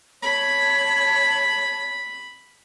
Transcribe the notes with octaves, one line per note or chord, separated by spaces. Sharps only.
C#5 A5 B5